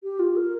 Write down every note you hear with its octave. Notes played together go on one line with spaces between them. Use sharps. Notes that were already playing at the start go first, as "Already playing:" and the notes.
G4
F4
A#4